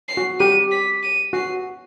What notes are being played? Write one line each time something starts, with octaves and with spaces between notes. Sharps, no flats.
C7
F#4
G4 D#7
B6
D#7
F#4 C7